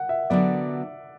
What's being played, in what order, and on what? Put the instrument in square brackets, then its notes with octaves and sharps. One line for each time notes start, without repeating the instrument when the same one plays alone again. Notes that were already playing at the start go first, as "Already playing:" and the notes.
Already playing: [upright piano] F#5
E5
[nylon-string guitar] D3 F#3 B3 [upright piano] D5